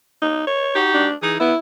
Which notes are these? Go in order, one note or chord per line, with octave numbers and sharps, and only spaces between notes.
D#4
C#5
D#4 F#4 G4
D4
E3 D#4 G#4
B3 E4